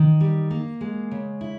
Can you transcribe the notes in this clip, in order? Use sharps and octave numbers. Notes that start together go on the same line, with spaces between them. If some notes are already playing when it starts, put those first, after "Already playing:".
Already playing: D#3
G3
A#3
G#3
C#3
E4